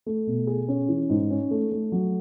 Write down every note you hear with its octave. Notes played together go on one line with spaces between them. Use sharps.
A3
B2
G#4
C#4
E3
G#2
C#4
A3
A3
F#3